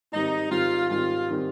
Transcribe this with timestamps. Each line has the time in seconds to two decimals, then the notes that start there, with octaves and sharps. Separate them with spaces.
0.12 G#2 D#3 G3 C4 D#4
0.50 G#2 D#3 G3 C4 F4
0.89 G#2 D#3 G3 C4 F4
1.28 D#3 G3 C4